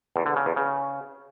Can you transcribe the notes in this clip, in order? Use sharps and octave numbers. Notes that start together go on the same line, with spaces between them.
E2
D3
C#3
E2
C#3